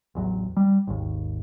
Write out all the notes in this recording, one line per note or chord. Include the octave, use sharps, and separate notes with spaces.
A1 E2 F#3
G3
G#1 D#2